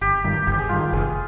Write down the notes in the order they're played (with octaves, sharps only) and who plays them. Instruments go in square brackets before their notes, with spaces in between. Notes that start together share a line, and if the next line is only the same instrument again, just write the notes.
[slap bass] G1 [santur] G4
[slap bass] G2 D#3
[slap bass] G1 [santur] G4
[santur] G#4
[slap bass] G2 D#3 [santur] F4
[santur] G4
[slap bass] F1 [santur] G#4